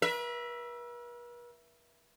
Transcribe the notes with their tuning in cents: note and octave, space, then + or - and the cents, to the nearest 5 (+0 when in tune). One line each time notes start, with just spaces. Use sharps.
B4 -45 E5 +10